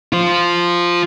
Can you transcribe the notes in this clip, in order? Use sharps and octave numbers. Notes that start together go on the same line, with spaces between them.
F4 C5